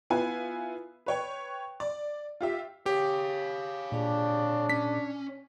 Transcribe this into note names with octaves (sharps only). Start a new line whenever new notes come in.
B3 E4 F4 B4 G#5
B4 C#5 G5
D5
F4 G4 E5
G4 C#5 F5
A#2 D4 G#4
C#4 B6